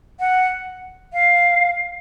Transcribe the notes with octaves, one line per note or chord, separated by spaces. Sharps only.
F#5
F5